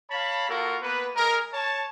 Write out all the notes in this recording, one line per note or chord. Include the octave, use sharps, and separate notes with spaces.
C#5 F5 A5 B5
A#3 F4 F#4 A4 A#4
A#3 B3 B4
G#3 G#4 A#4
C#5 A5